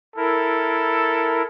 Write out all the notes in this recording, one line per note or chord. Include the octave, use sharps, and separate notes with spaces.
E4 A4 A#4